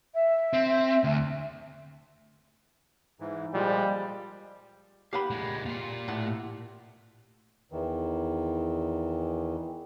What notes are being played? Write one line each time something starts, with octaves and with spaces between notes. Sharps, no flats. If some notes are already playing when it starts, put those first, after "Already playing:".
E5
C4
D2
G#2 E3
A#2 F3 G3 G#3
G4 F5 F#5 B5
A#2 G#3
A#2 F4
A2 F#5
E2 D#3 E3